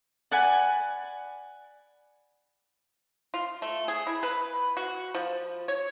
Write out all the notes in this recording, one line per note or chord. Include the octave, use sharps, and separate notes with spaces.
D5 F#5 G#5 B5
F4
A3
G#4
E4
B4
F#4
F3
C#5